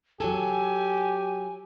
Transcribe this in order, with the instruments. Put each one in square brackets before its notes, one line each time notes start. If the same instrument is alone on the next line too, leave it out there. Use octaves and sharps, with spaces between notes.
[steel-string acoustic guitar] F#3 A4 [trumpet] G4 [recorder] G#5